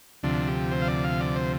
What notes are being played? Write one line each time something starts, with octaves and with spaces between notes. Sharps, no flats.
D2 C3 F3 D4
G4
C5
F5
D5
F5
D5
C5